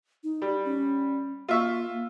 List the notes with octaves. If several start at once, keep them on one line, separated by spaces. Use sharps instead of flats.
D#4
G3
C#4
A#3 F4 E5 C#6